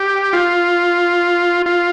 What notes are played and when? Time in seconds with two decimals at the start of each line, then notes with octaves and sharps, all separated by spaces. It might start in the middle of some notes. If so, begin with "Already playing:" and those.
Already playing: G4
0.33 F4
1.66 F4